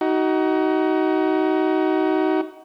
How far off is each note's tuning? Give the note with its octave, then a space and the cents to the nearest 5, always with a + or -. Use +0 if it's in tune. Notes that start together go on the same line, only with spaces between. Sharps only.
D#4 +20 F#4 +25